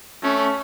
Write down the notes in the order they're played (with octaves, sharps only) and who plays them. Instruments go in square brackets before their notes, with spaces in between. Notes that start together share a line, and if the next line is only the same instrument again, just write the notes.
[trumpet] A3 [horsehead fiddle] C#4